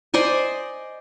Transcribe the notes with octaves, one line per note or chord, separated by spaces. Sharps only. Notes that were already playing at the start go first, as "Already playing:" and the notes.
C5 D5 D#5 G#5